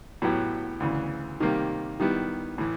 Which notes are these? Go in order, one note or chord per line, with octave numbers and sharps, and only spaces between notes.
A2 F#3 B3 E4 G4
D2 C#3 E3
C3 D#3 G3 A#3
D#3 G3 B3 E4
A2 E3